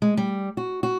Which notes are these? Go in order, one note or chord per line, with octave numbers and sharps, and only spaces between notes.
G#3
G3
F#4
F#4